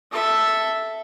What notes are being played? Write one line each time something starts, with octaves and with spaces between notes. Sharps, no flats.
A4 E5